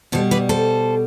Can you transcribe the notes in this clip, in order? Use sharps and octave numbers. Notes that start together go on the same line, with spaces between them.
B2 G3 A4 C5
B4 D5
A4 C5